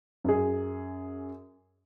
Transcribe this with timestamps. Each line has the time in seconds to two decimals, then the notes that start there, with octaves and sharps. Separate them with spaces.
0.24 F#2 G#4